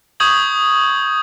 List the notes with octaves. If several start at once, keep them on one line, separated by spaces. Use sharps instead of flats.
C#6 D#6 G6 G#6 F#7